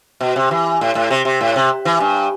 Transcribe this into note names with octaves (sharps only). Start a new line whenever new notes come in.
B2
C3
E3
A2
A2
C3
C3
A2
C3
E3
G2